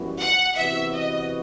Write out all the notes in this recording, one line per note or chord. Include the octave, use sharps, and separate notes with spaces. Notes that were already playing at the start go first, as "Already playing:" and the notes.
Already playing: F#2 E3 G3 B3 F#4
F#5
C3 E3 B3 F#4 E5
D#5